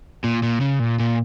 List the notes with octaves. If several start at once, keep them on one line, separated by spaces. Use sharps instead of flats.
A#2
A#2
C#3
A#2
A#2